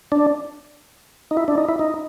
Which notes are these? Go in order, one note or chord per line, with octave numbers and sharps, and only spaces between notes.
D4
D#4
E4
D4
D#4
E4
D#4